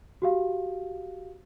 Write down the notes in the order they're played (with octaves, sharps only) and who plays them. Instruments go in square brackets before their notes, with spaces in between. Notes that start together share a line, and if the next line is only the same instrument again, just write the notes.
[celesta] F#4 G4 F5